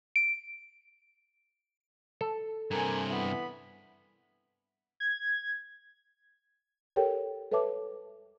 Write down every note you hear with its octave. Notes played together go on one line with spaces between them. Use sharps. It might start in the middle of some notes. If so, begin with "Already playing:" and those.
D7
A4
G2 C3 A#4 G#5
E3 B3 B5
G#6
G4 A4 A#4 C#5 G5
A4 B4 C#5 E5 A5 D6